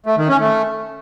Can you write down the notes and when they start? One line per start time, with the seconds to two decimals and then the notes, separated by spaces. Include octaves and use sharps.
0.06 A3
0.18 D#3
0.29 C#4
0.40 A3